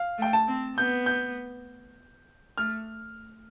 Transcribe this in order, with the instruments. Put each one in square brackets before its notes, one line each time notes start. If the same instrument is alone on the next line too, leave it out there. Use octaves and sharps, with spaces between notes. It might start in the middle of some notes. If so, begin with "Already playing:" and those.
Already playing: [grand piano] F5
[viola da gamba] A3
[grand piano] G5
A5
[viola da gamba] C4
[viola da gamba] B3 [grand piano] G6
[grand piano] G6
[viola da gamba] A3 [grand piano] F6